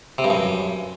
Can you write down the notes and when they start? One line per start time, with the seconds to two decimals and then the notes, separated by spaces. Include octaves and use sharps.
0.18 C3
0.24 G2
0.30 F#2